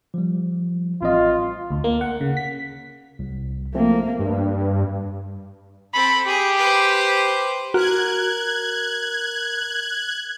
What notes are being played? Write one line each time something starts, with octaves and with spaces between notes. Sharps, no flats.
F3 G3
A1 C4 F4 D#5
D2
A#3
F#5
C#3
B6
C2
F3 A3 A#3 C4
G2
C4 A4 B5
G4 G#4
B4 C5
F#4 A#4 F#6 G#6